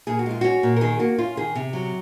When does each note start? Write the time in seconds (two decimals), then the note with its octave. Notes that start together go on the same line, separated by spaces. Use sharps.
0.07 A#2 G#4
0.19 F#4
0.26 G#3 F4
0.41 C#4 F#4
0.63 A#2
0.76 A#4
0.81 D#3 G#4
0.99 A#3 F#4
1.18 C#4 F4
1.37 D#3 G#4
1.55 C3
1.73 F#3